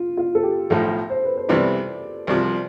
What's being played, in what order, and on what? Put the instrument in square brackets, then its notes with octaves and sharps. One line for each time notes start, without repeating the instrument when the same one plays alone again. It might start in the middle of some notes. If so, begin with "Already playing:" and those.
Already playing: [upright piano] F4
F4
A4
G4
[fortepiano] B1 A2 F3 [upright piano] A4
[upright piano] C5
B4
C5
[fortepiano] C2 C3 E3 B3 E4 [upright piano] D5
[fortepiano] C2 C3 F3